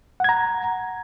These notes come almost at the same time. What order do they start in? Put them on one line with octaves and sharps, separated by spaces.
F#5 G#6 A#5